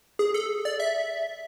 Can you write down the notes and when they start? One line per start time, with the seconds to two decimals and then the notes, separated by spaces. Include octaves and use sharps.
0.19 G#4
0.34 A4
0.65 D5
0.80 E5